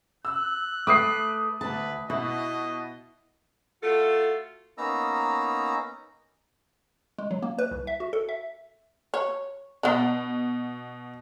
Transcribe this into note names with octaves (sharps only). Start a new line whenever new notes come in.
E6 F#6
A3 B4 D6 D#6 C7
D2 B4 A5
B2 E4 D#5
A3 F4 F#4 A4
A#3 B3 C#4 D#4 A#5 E6
G#3
F#3
A#3
B4
C2
E5
F#4
A4
E5
C#5
B2 B3 D4